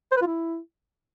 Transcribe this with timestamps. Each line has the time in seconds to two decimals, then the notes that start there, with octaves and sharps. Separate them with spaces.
0.12 C5
0.17 B4
0.22 F4
0.27 E4